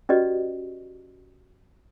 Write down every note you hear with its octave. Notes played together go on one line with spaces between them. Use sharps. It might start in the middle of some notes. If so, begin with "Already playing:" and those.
C#4 F#4 G4 B4 D5 D#5